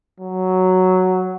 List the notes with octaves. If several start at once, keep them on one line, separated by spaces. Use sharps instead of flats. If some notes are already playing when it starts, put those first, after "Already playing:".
F#3